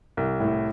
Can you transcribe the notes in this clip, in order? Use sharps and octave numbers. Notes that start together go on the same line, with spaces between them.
C2
A2